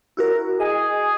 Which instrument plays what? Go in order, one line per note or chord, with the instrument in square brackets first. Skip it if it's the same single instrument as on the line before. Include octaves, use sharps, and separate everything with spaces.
[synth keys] E4 F#4 A#4
[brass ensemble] G#4 [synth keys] D#5